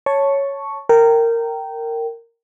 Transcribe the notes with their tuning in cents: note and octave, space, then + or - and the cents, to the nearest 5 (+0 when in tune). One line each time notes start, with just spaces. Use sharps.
C#5 +0 A5 +0 C#6 +0
A#4 -15 G5 -15